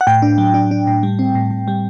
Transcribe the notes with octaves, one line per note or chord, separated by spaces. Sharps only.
F#5
A2 G5
D4
F#3
D4
D4
A2
G3
C4
A2
A2
G3